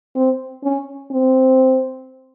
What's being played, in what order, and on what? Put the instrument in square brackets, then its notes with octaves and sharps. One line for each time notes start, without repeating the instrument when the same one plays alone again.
[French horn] C4
C#4
C4